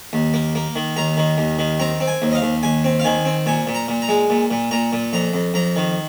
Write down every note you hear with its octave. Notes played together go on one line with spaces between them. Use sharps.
D#2
A#3
A#3
D#3
D#2 A#5
D#3
D#2
D#3
C4 A#5
C4
G#5
D#2
D#5
F5
D#2
D#2 G#5
C4
F5
D#3 G#5
C4
A#2 G#5
A#2
A#5
A#2
A#5
G#3
A#2
A#2
A#2 A#5
A#2
F2 A#5
F2
F2 A#5
D#3